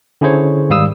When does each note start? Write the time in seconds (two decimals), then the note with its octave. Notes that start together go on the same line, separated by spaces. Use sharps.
0.21 D3 C#4 E4 G#4 C5 C#5
0.70 G#2 D#3 G3 F5 D#6 E6